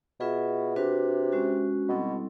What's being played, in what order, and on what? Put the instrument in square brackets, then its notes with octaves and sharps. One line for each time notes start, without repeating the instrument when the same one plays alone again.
[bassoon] B2 [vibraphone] F4 G#4 B4 E5
[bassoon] C3 [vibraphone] D4 F#4 B4
[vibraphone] G#3 C#4 F#4
[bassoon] B2 [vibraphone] G3 C4 E4 A4